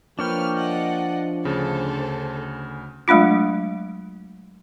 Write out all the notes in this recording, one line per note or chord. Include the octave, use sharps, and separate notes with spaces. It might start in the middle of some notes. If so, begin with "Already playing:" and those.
F3 A#3 D4 B4 C#5 G5 F6
D5 D#5 F#5
D2 C#3 A4 C5
F#3 G#3 A3 D4 F4